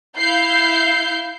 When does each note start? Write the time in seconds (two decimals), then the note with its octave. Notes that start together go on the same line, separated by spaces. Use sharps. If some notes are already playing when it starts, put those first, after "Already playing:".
0.17 E4 F5 G6 C7